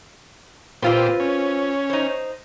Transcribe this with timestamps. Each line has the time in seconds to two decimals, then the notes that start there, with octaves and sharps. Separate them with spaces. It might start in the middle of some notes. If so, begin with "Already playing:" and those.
0.82 A#2 C4 F4 G4 B4 C5
1.20 C#4
1.90 D#4 C5